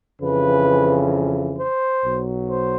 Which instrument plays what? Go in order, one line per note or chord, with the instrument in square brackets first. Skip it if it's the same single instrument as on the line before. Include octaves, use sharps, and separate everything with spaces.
[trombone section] F2 C#3 E3 B4
C5
B1 B2 F#3
C5